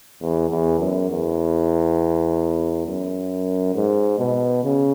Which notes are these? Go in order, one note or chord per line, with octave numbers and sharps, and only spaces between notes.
E2
E2
F#2
E2
F#2
G#2
B2
C#3